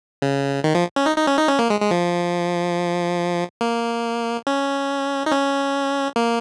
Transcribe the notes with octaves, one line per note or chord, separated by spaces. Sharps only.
C#3
D#3
F3
C#4
D#4
D#4
C#4
D#4
C#4
A#3
G#3
G#3
F3
A#3
C#4
D#4
C#4
A#3